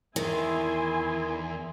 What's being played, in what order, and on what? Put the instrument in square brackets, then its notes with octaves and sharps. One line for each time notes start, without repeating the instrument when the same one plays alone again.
[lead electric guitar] E2 [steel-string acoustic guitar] D#3 [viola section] E4 G#5 C6